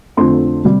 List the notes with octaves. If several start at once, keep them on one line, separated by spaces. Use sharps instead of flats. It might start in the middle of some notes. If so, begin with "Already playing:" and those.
F2 D3 A3 C4 F4 C6
C3 G3